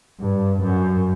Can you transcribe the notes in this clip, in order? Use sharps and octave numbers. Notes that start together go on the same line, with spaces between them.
G2
F#2